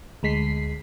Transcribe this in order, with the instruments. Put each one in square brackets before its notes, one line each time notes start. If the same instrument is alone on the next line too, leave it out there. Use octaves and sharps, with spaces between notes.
[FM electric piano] D2 G#3 B6 C7